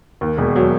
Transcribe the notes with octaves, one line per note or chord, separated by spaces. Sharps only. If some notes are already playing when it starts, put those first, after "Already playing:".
D#2
E1
F#3